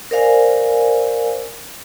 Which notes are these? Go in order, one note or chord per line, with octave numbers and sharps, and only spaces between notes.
A#4 C5 D5 F5 G#5